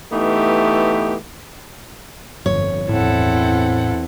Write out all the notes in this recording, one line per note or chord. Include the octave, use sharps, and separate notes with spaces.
E3 A3 B3 D#4 G4
G1 F2 C#5
E2 A2 C4 E4 A4 F#5